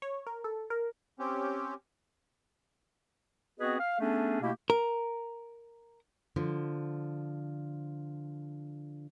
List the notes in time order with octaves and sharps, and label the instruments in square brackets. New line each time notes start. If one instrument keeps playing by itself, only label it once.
[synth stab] C#5
A#4
A4
A#4
[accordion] C4 C#4 G4
[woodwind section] B3 C4 F#4 G#4 B4 D#5
F5
A3 B3 C#4 D4 G#4 A4
B2 A3 A#3 E4 G4
[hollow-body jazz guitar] A#4
[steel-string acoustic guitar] D3 F3